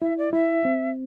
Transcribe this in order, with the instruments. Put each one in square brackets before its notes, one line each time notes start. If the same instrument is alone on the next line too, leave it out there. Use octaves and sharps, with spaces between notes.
[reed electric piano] E4 [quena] E5
[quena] D5
[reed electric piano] E4 [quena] E5
[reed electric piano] C4